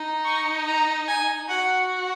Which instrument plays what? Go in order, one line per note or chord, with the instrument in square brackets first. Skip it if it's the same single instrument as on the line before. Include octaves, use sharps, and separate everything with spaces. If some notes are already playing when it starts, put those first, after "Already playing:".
Already playing: [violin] D#4
[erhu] C#6
A#5
G#5
[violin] F#4 [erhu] F#5